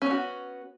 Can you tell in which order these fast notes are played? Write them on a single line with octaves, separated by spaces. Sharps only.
C#4 B3 F#4